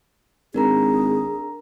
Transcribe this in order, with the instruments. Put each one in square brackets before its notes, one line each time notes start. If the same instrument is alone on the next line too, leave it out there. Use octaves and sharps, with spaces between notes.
[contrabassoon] G#1 [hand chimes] D4 A#4 A#5 [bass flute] G#4